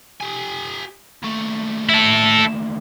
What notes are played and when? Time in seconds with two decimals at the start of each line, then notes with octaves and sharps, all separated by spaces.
0.21 G4 G#5
1.23 D#2 A3
1.90 E4 A4